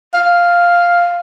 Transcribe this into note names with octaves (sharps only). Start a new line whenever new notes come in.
F5